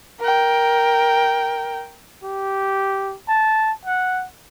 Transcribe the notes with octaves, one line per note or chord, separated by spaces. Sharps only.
A#4 G5
G4
A5
F#5